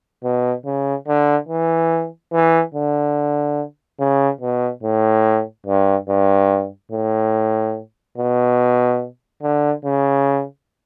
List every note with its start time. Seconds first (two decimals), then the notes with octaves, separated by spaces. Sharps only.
0.24 B2
0.65 C#3
1.07 D3
1.49 E3
2.33 E3
2.74 D3
4.00 C#3
4.41 B2
4.83 A2
5.67 G2
6.08 G2
6.92 A2
8.18 B2
9.43 D3
9.85 C#3